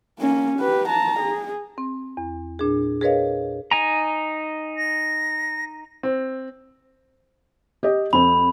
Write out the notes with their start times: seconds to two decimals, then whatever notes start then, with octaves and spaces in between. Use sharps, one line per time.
0.19 A#3 C#4
0.59 G4 B4
0.89 A5 A#5
1.20 G#4
1.78 C4
2.17 E2
2.59 A#2 D4 G#4
3.01 G#4 A#4 B4 C#5 D#5 F5
3.71 D#4 G#5 A#5
4.77 A#6
6.03 C4
7.83 G4 D#5
8.13 F2 C4 B5